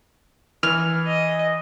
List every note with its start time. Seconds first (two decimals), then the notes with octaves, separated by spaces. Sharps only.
0.63 E3 F6
1.07 D#5